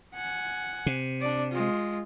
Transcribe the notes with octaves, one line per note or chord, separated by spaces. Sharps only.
F#5 G#5
C3
D4 D5
G#3 F4